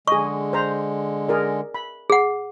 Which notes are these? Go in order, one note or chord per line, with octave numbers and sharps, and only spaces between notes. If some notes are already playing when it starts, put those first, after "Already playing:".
D3 G#3 G#4 D#5 C#6
C5 A#5
G#4 A#4 D5
B5
G#4 F#5